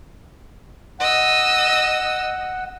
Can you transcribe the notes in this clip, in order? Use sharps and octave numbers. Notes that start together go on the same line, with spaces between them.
D#5 F#5 E6